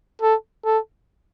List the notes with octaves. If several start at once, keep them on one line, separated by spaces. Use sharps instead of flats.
A4
A4